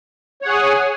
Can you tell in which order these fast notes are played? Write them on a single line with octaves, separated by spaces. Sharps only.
C#5 F#5 G#4 G#5